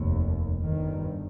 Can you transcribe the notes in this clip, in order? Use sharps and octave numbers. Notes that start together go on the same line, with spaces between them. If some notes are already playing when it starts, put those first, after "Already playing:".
Already playing: F1 D#2
G1 G2 D#3